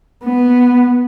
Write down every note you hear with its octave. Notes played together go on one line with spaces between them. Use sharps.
B3